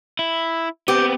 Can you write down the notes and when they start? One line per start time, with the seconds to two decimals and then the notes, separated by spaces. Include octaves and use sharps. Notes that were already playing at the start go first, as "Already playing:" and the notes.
0.19 E4
0.88 B3 C4 G4